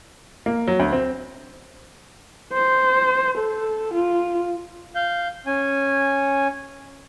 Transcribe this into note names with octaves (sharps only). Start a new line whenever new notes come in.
A#3
F#3
D2
C4
C5
A4
F4
F5 G6
C#4 G#5